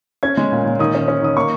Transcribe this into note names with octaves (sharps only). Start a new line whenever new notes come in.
C#4 G#6
G#3
A#2
A#2
D#3 D#6
C#4
C#4
D#3 D#6
A#3 C#6